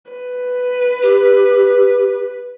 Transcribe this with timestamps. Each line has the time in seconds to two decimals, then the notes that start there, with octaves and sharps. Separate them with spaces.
0.11 B4
1.02 G4